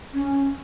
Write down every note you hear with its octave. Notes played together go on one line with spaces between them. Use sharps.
C#4